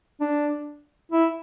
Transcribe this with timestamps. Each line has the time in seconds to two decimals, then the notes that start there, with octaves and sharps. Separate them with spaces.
0.21 D4
1.12 E4